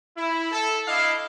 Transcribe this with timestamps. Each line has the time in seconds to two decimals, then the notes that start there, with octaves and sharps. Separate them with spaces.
0.17 E4
0.52 A4
0.88 D4 E4 D#5 F5